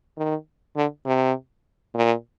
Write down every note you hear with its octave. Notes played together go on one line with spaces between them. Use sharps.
D#3
D3
C3
A#2